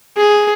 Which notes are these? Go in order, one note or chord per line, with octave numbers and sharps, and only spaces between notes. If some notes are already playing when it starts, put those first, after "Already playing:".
G#4